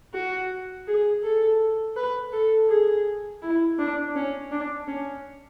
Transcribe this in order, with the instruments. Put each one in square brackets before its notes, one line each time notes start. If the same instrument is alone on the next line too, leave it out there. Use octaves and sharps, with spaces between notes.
[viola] F#4
G#4
A4
B4
A4
G#4
E4
D4
C#4
D4
C#4